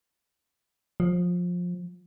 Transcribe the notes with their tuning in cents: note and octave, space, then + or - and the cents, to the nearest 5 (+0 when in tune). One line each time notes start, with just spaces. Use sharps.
F3 +20